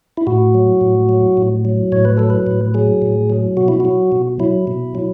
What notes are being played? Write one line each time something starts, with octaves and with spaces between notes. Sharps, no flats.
E4
A2 F#4
F#3
A2
F#3
A2
F#3
A2 C#5
B4
F#3 A4
B4
A2
F#3 G#4
A2
F#3
B2 F#4
E4
F#3 F#4
B2
F#3 E4
B2
F#3